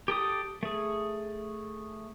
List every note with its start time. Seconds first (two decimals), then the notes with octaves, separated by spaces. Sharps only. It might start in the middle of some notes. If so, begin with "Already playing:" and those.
0.08 G4 A4 D#6
0.63 A3 G#4